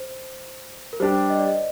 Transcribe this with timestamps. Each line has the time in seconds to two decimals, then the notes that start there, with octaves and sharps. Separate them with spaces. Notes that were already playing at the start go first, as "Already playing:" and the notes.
Already playing: C5
0.93 A#4
1.00 G3 D4 G4 C5
1.30 D#5
1.39 D5
1.47 D#5